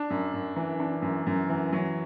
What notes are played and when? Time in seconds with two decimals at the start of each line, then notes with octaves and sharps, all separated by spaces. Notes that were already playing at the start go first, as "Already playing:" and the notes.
Already playing: D4
0.10 F#2
0.33 F#2
0.56 E3
0.80 D4
1.02 F#2
1.27 F#2
1.49 E3
1.73 F#3